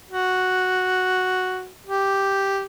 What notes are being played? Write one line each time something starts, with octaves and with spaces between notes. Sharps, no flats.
F#4
G4